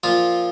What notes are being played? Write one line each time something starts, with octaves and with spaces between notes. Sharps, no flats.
A#2 F3 F4